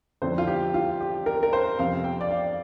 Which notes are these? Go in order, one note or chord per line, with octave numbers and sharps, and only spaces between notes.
F2 D3 F3 C5
F4
G4
F4
G4
A#4
A#4
C5
F2 C3 F3 F5
G5
D5
F5